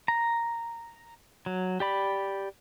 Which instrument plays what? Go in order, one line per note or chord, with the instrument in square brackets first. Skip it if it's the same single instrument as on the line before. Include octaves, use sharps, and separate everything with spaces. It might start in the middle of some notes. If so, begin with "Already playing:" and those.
[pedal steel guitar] A#5
F#3
G4 D5 B5